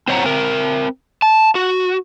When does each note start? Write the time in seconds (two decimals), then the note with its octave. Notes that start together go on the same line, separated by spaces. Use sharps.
0.08 C4 C5 C#5 F#5 A#5
0.24 C4 A#4
1.22 A5
1.55 F#4